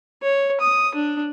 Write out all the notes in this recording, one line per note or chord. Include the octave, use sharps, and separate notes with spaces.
C#5
D#6
D4